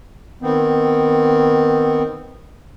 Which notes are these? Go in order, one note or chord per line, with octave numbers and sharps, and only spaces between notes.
D#3 B3 C4